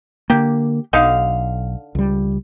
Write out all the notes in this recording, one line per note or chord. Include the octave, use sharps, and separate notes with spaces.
D3 A#3 G4
B1 D3 D#4 F5
C#2 G3